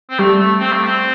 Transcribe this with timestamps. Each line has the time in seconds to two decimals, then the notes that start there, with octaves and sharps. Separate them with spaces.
0.10 C4
0.19 G3 A3
0.39 A3
0.60 C4
0.72 A3
0.84 C4